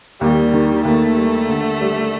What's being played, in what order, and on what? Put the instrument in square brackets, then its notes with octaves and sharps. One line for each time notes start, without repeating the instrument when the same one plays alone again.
[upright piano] D#2 [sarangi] G3
[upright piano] D#3
[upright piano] D#2 [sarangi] A3
[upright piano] G3
D3
G3